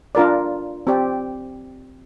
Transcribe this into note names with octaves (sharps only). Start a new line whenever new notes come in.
D4 F4 A#4 D5
C4 G4 D5